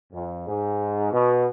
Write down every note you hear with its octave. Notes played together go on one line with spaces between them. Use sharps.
F2
G#2
B2